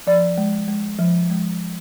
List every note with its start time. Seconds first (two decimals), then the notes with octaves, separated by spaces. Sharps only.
0.07 F3 D5
0.38 G#3
0.68 G#3
0.99 F3
1.30 G#3